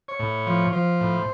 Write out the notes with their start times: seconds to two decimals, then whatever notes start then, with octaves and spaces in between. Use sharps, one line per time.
0.08 C#5
0.19 A2
0.47 F3
0.73 F3 C5
1.01 A2